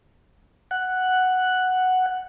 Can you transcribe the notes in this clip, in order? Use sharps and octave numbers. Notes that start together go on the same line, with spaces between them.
F#5